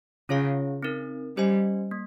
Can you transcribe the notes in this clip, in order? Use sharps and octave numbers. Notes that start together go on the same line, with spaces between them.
C#3 C#4 F4 G#4 C#5 F5
C4 D#4 A#4
G3 C#4 G4 C5 D#5 G#5
A#3